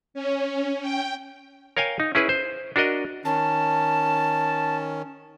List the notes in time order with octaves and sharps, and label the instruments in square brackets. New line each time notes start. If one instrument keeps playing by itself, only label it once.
[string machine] C#4
G5
[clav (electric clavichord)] A#4 C#5 F5 G5 G#5
D#4
C#4 E4 G#4 B4
C5
D4 F#4 A#4 D#5
[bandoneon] D#3 C#4 [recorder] A5